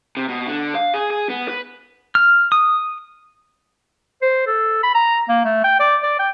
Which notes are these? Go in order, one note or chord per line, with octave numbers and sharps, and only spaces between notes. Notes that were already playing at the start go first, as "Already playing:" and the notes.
C3
B2
D3
F5
G#4
G#4
B3
B4
F6
D#6
C5
A4
B5
A#5
A#3
A3
G5
D5
D5
G5